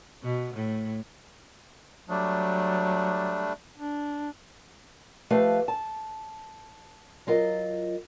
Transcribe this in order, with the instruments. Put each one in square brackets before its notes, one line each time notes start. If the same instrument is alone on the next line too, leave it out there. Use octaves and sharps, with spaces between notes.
[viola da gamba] B2
A2
[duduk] F#3 [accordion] G3 A3 D4
[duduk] D4
[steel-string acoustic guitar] F3 A3 G4 B4 F5
A5
F#3 F4 A#4 D#5